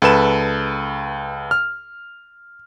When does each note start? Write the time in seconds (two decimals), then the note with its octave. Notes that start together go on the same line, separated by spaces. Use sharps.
0.02 C#2 A4 B4 E7
1.51 F6